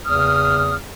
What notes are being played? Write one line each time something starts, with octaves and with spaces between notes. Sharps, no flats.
E2 C#3 B4 D#6 F6